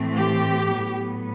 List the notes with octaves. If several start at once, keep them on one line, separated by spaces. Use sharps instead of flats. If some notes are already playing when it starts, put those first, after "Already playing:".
Already playing: A2 E3 A3 C4
G4
A2 F#3 B3